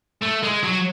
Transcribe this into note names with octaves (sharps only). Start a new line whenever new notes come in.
A3
G#3
F#3